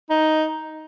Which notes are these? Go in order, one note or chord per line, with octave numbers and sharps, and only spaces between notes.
D#4